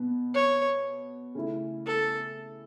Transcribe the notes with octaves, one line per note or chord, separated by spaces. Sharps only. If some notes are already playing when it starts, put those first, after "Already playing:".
Already playing: B2 B3
C#5
C#3 A3 C#4 E4
A4